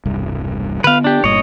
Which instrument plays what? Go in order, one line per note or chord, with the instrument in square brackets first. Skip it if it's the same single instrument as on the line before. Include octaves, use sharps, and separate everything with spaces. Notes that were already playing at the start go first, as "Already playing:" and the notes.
[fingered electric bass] E1 C2 G2
[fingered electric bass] D3 B3 [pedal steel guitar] B4 F5
[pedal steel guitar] D4 G4
[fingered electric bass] G1 G2 A#2 [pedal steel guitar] C#5 D#5